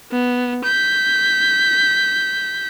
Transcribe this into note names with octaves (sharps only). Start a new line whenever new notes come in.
B3
G6 B6